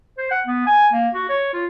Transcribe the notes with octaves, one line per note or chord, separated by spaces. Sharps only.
C5
F#5
B3
G#5
A#3
F#4
C#5
F4